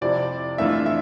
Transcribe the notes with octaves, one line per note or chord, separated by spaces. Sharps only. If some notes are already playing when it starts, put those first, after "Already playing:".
F2 C3 F3 C4 E4 D5
F2 E3 A3 D4 F4 E5
E5